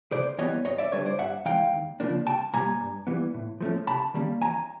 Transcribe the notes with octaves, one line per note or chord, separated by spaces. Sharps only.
C3 C5 D5
E3 G3 B3 C#5 D#5
G2 C#5 D#5
D5 E5
D3 G3 B4 C#5
C5 D5
G2 E5 F#5
E3 G#3 F5 G5
D#2
C#3 F3 A#3 D4
C2 G5 A5
B2 G3 A#3 G#5 A#5
G2
E3 G3 B3
A2
F3 A3 C#4
C3 A5 B5
D#3 G3 A#3 C#4
E2 G#5 A#5